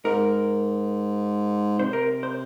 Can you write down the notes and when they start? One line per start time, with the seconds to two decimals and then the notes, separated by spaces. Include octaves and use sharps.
0.05 G#2 A#4
1.79 C3 C5
1.93 A#4
2.23 C5